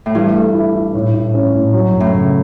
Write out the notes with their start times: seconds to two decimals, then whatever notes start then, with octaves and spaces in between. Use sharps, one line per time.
0.06 A2
0.15 G2 E3
0.35 A3
0.54 E4
0.75 E4
0.94 A2
1.14 A2
1.34 C#4
1.54 A2
1.74 F#3
1.93 F#2
2.00 A2
2.13 C#3